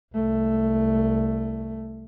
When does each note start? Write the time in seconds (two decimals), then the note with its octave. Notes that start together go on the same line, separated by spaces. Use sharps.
0.14 C2 A3